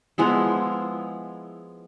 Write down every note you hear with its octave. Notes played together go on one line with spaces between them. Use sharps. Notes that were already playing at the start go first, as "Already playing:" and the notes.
F3 G#3 B3 E4